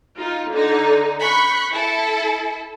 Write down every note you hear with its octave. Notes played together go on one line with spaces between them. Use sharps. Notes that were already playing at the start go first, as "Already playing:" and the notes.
D#4 F4
D3 D#4
B5 C#6 F#6 G6
E4 A4